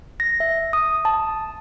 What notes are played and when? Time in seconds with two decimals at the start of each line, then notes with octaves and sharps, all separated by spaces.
0.20 A#6
0.40 E5
0.73 D#6
1.05 A5